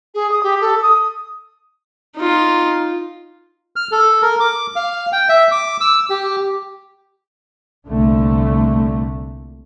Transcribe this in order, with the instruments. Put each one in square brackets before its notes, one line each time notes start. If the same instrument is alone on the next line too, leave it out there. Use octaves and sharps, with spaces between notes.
[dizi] G#4
D#6
G4
A4
D#6
[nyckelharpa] D#4 F4
[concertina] F6
A4
A#4
D6
F5
G5
E5
D6
E6
G4
[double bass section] C2 A#2 D3 A3